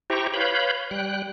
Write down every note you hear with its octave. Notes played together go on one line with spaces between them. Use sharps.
E4 G4 C5 G5 A#5 C#6
B4 C#5 F5 B5 G6
G3 G5 F#6